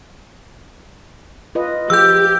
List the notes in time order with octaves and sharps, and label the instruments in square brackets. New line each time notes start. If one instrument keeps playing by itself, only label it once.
[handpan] F4 B4 D#5
[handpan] F3 [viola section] G4 [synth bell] E6 G6